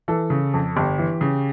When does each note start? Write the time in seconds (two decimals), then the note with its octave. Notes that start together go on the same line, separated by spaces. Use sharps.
0.08 E3 A4
0.30 C#3
0.54 F2
0.76 G1 G4
0.99 E3
1.21 C#3